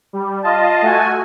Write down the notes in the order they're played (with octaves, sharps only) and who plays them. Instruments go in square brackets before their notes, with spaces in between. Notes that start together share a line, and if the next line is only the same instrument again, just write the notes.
[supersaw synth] G3
[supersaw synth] F4 D#5 [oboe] A5
[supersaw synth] A3 F#4 G#5